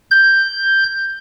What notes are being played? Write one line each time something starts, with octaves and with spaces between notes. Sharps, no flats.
G6